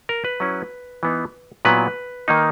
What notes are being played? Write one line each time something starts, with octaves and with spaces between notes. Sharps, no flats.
A#4
B4
F#3 C#4 E4
E3 B3 D#4
A#2 F#3 B3 E4 B4
D#3 A#3 D#4